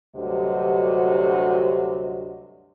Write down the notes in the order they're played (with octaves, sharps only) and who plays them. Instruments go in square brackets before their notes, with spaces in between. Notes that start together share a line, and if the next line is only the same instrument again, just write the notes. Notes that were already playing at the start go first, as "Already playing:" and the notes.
[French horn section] D2 G2 C3 F#3 F#4 D#5